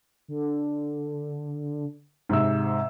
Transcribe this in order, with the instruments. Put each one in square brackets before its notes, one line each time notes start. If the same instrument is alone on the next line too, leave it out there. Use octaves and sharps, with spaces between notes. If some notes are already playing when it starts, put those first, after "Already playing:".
[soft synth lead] D3
[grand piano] G#2 C3 E6